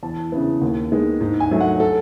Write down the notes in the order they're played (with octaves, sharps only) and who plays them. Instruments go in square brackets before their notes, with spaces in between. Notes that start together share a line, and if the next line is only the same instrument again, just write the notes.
[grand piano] E2 A5
C#3 E3 B3
D#2
D#3 G#3 B3
G#2
G#5
F#3 A3
F#5
A4